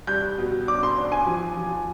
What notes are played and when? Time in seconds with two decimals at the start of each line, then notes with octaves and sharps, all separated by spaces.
0.07 G3 G6
0.38 B2
0.67 D4 D6
0.83 C6
0.97 D4
1.12 G#5
1.27 F3
1.57 F3